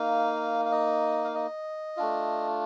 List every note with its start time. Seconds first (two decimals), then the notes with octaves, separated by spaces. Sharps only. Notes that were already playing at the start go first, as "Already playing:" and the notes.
Already playing: A#3 D#4 F5
0.65 F5
0.71 D#5
1.25 F5
1.35 D#5
1.97 A3 D4 F4